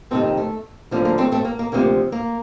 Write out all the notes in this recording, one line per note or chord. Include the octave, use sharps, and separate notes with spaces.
F2 C3 D#3 A3 C4
A#3
A3
D2 D3 F3 A#3
A#3
A3 C4
A3 C4
A#3
A#3
D2 C3 F3 A#3
A#3